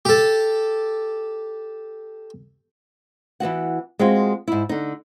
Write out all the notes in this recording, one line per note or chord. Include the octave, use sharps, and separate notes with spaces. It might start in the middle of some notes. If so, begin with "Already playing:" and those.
G4 A4
E3 B3 F#4 F#5
G#3 C4 F4 F#4 G#4
G#2 E4
D3 D#4